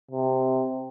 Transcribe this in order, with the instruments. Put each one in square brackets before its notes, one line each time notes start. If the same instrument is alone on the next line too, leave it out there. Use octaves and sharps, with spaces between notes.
[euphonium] C3